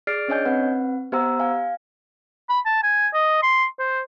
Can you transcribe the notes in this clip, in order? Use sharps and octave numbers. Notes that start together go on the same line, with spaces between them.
G#4 D5 F6 A6 C7 D7
C#4 D4 C#5 D#5 G#5 G6
C4 B4 F#5
B3 G4 C5 F#5 A#5 E6
F5 G#5
B5
A5
G#5
D#5
C6
C5